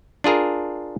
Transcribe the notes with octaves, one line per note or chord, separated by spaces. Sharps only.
D4 F4 G#4 A#4